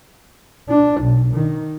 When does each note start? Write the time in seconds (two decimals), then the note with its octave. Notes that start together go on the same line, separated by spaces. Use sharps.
0.69 D4
1.00 B1
1.34 D#3